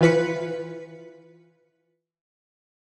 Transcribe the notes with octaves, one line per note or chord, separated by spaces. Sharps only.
E3 F4 B4 B6 C#7